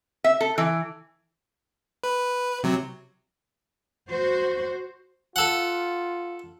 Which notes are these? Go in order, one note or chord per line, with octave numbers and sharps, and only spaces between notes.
E5
A4
E3
B4
C3 F#3
F#4 C5
F4 A4 F#5